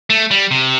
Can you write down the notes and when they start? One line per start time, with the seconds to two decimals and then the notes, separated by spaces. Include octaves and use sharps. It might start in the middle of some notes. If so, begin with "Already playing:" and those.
0.10 A3
0.31 G3
0.51 C3